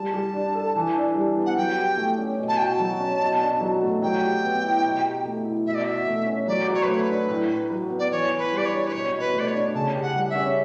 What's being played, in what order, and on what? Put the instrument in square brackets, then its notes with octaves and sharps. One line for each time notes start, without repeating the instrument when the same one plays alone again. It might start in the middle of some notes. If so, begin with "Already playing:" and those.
Already playing: [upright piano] G3 [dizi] A5
[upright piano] G3
D4
A4
E3
D4
G3
B3
[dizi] F#5
[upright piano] F#3 [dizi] G5
[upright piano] G4
A3
C#4
B2
[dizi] A5
[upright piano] F#4 [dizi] G5
[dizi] A5
[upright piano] F#3
C#4
B2
D4
F#3
A3
[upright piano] F#3 [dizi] G5
[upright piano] G4
B3
E4
B2
G4
A3
E4
[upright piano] B2 [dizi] E5
[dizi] D5
[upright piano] F#4 [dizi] E5
[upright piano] A3
C#4
[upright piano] F#3 [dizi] D5
[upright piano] F#3
[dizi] C#5
B4
[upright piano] A3 [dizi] C#5
[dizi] B4
[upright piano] D4
A2
A2
F#3
B3
[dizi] D5
[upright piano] E3 [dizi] C#5
[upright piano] E3
[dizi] B4
[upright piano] G3 [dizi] D5
[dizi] C#5
[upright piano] D4
[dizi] B4
[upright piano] B2 [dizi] C#5
[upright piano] B2
[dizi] B4
[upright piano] A3
[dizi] D5
C#5
[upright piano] D4
[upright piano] C#3 [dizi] A5
[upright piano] G4
[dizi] F#5
[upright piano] G3
[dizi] E5
[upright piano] C#4